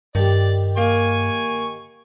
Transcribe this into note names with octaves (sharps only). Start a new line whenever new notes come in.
G2 D#3 G4 D5
A#3 G#5 C#6